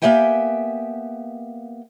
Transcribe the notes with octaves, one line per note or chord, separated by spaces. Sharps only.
A#3 B3 G4 E5 G5 G#5